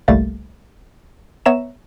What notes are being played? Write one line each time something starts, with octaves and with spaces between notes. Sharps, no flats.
G1 C2 G3 A3 A#3 A6
B3 C#5 E5 A#5 E7